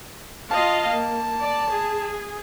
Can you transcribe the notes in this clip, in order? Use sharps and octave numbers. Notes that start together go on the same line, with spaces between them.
F4 D#5 F5 A5
A#3
D5
G#4